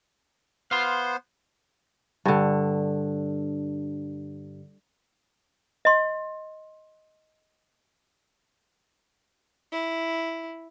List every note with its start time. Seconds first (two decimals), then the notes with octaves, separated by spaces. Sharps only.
0.71 B3 C5 F5 C6
2.25 G2 D3
5.85 D#5 C6
9.72 E4